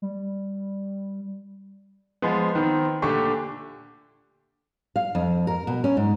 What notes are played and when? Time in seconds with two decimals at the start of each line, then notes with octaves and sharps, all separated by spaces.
0.02 G3
2.22 F3 G#3 B3
2.55 D#3 B3 C4
3.02 A#2 D3 A3 D4 G4 C#6
4.96 F5
5.15 F2
5.47 A#4
5.67 B2
5.84 C#4
5.97 G#2